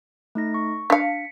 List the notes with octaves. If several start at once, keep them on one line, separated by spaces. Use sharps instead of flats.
A3 D#4 A#6
C#6
D4 F5 B6 C#7